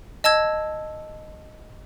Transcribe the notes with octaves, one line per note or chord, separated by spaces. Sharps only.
D#5 A5 E6 G#6